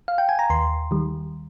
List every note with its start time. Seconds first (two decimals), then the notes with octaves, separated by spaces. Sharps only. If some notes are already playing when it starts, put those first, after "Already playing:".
0.08 F5
0.18 G5
0.29 G#5
0.39 A#5
0.50 D#2 C6
0.91 D#3 G3